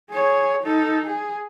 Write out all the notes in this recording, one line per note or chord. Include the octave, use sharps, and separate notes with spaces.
G#4 C#5
D#4 A4
G#4